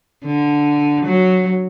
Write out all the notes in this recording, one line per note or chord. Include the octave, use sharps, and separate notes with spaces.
D3
F#3